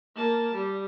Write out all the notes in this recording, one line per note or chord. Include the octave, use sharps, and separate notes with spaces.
A#3 A5
G3